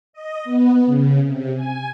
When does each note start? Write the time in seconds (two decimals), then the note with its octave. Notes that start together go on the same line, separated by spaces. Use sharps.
0.13 D#5
0.44 B3
0.86 C#3
1.23 C3
1.55 G#5